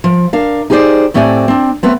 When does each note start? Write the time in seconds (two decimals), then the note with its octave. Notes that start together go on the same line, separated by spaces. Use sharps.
0.04 F3
0.33 D4 A#4 F5
0.70 D#4 G4 G#4 A#4 C5 D5
1.14 A2 A3 C4 G4 D5 G#5
1.48 C4 D4
1.83 A3 B3 C4